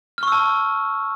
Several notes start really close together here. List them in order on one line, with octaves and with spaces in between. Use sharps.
F6 C#6 E6 A5